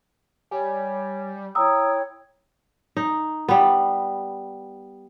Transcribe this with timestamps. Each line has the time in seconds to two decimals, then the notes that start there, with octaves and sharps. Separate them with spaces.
0.51 G3 C#5 G#5
1.55 E4 C#5 G5 A#5 D#6 E6
2.97 D#4
3.49 G3 B3